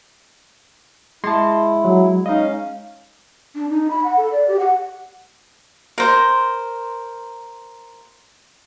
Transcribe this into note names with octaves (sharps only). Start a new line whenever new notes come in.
G#3 E4 A5 C6
F#3
C#4 D#4 D#5 F5
D4
D#4
B5
F#5
A4
D5
G4
F#5
A#4 C5